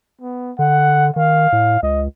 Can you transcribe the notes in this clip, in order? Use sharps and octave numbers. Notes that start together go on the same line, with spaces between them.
B3
D3 F#5
D#3 F5
A2
C#2 D#5